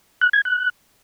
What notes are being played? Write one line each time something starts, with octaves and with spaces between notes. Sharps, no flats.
F#6
G#6
F#6